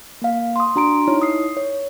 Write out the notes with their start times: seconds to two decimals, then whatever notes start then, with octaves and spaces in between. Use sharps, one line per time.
0.22 A#3 F5
0.56 C6 D#6
0.76 D4 F#4 A#5 C6 D7
1.08 D#4 E4 C#5
1.22 D#6 C7
1.57 C#5